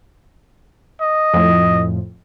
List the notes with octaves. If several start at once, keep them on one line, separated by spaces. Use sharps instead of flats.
D#5
F2 A2